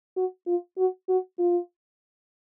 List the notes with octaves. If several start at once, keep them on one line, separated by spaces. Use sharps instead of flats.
F#4
F4
F#4
F#4
F4